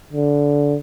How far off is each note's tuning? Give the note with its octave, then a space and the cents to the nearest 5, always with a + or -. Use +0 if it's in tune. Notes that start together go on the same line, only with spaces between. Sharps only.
D3 -20